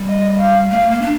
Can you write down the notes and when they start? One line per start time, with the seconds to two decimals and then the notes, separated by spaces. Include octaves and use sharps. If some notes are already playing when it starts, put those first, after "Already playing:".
Already playing: G3
0.09 D#5
0.39 F5
0.70 A3 F5
0.80 A3
0.91 A#3
1.02 D4